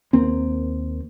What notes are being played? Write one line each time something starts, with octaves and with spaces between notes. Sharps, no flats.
D#2 A#3 C4